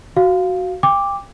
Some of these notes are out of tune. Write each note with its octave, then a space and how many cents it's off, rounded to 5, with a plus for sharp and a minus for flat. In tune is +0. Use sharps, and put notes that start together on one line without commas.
F#4 +0 F5 +0
G5 +30 D6 +0